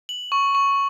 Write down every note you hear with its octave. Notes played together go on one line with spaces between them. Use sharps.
F#7
C#6
C#6